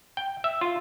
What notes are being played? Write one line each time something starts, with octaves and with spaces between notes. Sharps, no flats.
G5
E5
F4